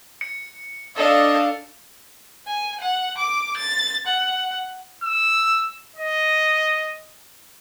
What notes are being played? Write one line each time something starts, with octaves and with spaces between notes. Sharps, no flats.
C#7
D4 A4 D#5 F5
G#5
F#5
D6
A6
F#5
E6
D#5